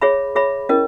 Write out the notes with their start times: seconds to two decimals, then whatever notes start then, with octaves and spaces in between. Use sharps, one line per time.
0.02 G#4 C#5 E5 B5
0.36 G#4 C#5 E5 B5
0.69 C#4 E4 A#4 D#5